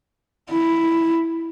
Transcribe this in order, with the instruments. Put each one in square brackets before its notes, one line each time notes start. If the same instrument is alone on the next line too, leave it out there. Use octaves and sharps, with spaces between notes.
[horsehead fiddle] E4